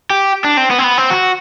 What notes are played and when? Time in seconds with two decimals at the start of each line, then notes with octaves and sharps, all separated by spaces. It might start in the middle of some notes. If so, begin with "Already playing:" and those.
0.10 G4
0.44 D4
0.57 C4
0.70 B3
0.79 C4
0.84 B3
0.98 C4
1.10 F#4